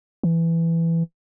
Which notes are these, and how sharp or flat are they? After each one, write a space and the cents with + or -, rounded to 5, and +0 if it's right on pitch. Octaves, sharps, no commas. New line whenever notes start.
E3 +10